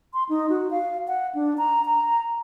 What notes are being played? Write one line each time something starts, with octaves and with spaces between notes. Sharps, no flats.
C6
D#4
F#4
F5
F#5
D4
A#5
A#5